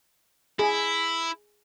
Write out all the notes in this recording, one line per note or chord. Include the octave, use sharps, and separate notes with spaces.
E4 G#4